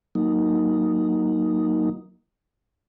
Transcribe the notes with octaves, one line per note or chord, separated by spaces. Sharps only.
F#3 A#3 D#4